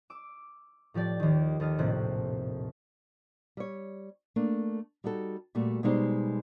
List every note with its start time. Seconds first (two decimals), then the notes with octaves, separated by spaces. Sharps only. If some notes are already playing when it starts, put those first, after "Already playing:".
0.10 D6 E6
0.94 A2 F3 G4 D5 A6
1.20 D#2 D#3
1.60 D#2 A4 D#5 F6
1.78 A#1 F2 A2 C3 F#6
3.57 G3 C#5
4.36 A3 A#3 D4
5.04 G3 D#4 F#4 A4
5.55 A#2 G3 A3 F#4
5.83 B2 G3 G#3 D#4 G4 C5